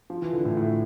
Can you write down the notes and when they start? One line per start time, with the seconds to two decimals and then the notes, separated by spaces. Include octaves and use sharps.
0.10 F3
0.22 E3
0.33 D3
0.45 A2
0.57 A2